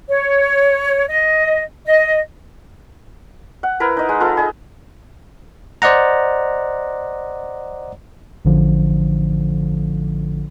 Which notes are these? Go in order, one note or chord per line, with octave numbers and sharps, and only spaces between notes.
C#5
D#5
D#5
F#5
E4 A#4 B4
D#4 D#5
G#3
F4 A4 B4
G#4 D#5
C5 D5 D#5 F#5 A#5
A1 D3 F3